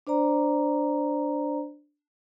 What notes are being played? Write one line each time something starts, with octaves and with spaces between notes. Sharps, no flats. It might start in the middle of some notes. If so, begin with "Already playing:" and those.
D4 C5 D5 A#5